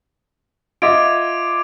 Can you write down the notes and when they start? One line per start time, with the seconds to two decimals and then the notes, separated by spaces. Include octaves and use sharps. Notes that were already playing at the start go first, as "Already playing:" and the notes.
0.82 F4 D#5 E5 D6 G#6 D7